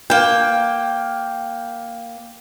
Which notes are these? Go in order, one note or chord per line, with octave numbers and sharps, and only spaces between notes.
A#3 G5